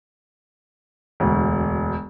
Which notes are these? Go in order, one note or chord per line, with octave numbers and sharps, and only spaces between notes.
E1 D2